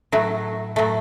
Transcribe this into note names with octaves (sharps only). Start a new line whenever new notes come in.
A2 F#3 A3
A2 F#3 A3